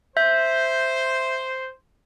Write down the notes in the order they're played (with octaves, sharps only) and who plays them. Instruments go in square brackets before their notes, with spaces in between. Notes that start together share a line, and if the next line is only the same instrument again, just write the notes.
[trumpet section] C5 [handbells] E5 G6